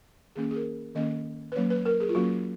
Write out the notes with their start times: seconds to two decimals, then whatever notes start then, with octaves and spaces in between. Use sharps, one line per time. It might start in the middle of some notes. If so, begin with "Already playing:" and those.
0.36 D#3 A#3 C#4 G#4
0.51 G#4
0.56 A#4
0.95 D#3 A#3 C#4 D#5
1.52 B4
1.55 F#3 A#3 C#4 C#5
1.70 B4
1.85 A#4
2.00 G#4
2.09 F4
2.15 F#3 A#3 C#4 F#4